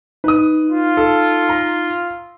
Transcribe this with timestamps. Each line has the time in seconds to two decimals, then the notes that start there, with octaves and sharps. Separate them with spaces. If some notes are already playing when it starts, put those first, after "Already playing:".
0.24 D#4 B4 D#6
0.68 F4
0.97 A4
1.49 A#5